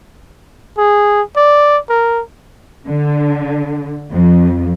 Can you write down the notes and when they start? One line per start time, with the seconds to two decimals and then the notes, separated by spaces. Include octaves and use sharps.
0.78 G#4
1.36 D5
1.89 A#4
2.87 D3
4.12 F2